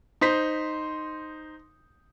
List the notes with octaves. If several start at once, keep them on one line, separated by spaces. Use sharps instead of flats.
D#4 C5 B6